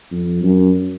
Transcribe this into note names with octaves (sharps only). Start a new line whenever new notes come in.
F2
F#2